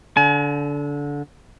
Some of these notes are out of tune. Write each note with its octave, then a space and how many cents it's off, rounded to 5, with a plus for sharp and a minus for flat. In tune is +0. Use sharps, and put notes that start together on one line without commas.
D3 -20 G#5 +40